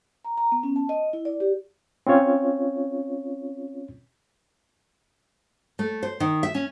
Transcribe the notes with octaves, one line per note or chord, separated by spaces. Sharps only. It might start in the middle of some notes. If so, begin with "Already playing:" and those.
A#5
A#5
B3
C#4
A5
D#5
E4
D5
G4
C4 C#4 F4 C#5
A3
C5
D#3
E5
C#4